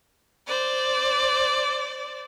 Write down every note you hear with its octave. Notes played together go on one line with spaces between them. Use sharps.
C5 D5